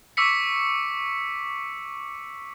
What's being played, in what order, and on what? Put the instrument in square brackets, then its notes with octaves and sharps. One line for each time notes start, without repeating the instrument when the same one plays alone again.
[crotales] C#6 D6 E6 B6 C#7